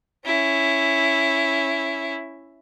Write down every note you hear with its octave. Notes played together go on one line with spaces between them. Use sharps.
C#4 E4